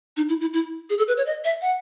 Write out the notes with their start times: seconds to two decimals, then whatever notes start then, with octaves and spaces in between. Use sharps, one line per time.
0.17 D#4
0.29 E4
0.41 E4
0.53 E4
0.90 G#4
0.98 A4
1.08 B4
1.17 C#5
1.26 D#5
1.45 E5
1.62 F#5